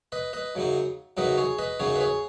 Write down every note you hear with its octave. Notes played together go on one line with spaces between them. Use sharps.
B4 D#5
B4 D#5
F#2 C#3 F#3 D#4
F#2 C#3 F#3 D#4 B4 D#5
G#4 C#5
B4 D#5
F#2 C#3 F#3 D#4 G#4 C#5
B4
G#4 C#5